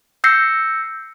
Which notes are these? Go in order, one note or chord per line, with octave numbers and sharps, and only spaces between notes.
E6 G6 A#6 C7 C#7